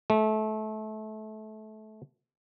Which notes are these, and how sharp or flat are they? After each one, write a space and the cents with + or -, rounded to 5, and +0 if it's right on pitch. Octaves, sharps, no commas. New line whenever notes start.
A3 -25